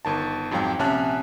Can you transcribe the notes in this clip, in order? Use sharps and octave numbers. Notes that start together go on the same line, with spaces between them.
G1 D#3 A5
F2 G#2 F#3 F5 G5
A#1 C3 C#4 E5 A5 F#6